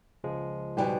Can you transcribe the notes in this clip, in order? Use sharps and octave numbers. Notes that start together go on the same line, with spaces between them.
C#2 F3 G#3
G#2 B2 G3 B4 D5 G5